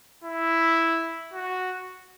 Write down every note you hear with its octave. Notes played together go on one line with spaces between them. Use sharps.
E4
F#4